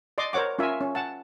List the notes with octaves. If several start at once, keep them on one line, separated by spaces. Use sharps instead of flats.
D5 D#5 C6 D6
A#4 C5 C#5 F#5 D6
C#4 F4 A#4 E5 G#5
C#4
F#5 A5